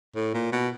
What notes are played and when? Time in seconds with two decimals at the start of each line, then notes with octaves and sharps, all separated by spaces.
0.16 A2
0.34 A#2
0.52 B2